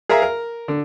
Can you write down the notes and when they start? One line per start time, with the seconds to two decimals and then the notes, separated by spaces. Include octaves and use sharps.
0.09 G#4 A#4 E5 F5 A#5
0.22 A#4
0.68 D3